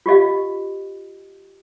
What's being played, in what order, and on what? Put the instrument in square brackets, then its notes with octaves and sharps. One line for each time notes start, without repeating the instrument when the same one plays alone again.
[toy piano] F4 G4 D#5 F5